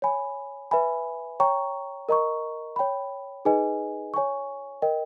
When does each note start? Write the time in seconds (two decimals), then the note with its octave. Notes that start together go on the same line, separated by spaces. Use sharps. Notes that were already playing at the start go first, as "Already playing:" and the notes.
0.02 C#5 G#5 B5
0.71 B4 E5 G#5 B5
1.40 C#5 G5 A#5 C#6
2.09 A#4 D#5 A#5 C#6
2.76 C#5 G5 B5
3.45 D#4 G#4 B4 D#5 G#5
4.14 C#5 G#5 C#6
4.82 A#4 D#5 G5